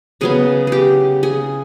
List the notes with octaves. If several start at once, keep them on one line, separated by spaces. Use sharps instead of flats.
C#3 F#3 B3 G#4
G4 G#4
G#4